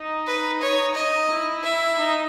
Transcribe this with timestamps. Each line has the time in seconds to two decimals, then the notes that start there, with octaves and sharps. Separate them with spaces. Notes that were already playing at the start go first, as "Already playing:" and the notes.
Already playing: D#4
0.27 B4
0.62 C#5
0.95 D#5
1.29 E4
1.63 E5
1.98 D#4